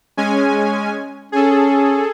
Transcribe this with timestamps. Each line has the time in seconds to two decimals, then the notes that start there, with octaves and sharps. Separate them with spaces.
0.17 G#3 C#4 G#5
1.32 C#4 G#4 A4